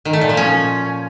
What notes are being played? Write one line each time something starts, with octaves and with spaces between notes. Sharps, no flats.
D#3
A3
A#2
F3
C#4